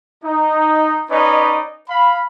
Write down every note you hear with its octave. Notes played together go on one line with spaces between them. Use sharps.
D#4
C#4 D#4 B4 D5 D#5
F5 B5